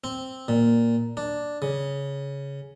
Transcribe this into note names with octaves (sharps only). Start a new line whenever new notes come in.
C4
A#2
D4
C#3